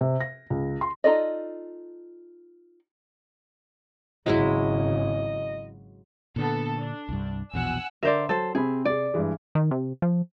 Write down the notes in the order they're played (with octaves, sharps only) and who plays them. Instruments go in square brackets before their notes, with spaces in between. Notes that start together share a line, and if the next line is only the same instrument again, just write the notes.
[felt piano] C3
A#6
C#2
C6
[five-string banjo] D#4 F4 A4 D5 D#5
[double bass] G#1 C#3 [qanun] F#3 G#3 E4 [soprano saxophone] D#5
[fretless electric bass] A#2 D3 [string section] B3 A4
[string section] D4
[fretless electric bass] C2 G2
[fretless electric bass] A#1 E2 B2 [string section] F#5 G#5 E6
[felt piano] D3 E5 E7 [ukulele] A#4 C5 D5
[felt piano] F#3 [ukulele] A4 C5
[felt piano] C3 C4 B5 [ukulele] G#4
[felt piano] C3 G#4 [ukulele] D5
[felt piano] G2 E3 G#3
[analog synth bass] D#3
C3
F3